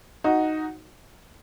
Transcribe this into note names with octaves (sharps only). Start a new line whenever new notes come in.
D#4 F#4